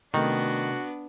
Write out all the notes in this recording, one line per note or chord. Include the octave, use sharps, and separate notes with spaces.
C3 D#3 A3 B3 D4 F#4